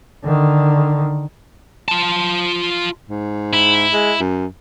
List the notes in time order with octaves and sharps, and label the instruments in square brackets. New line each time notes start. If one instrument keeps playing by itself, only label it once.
[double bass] D3 D#3
[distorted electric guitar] F4 A5
[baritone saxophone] G#2
[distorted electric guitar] E4
[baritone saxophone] G#3
F#2